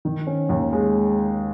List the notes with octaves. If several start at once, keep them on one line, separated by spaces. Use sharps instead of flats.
D#3
C#4
D#2
G#3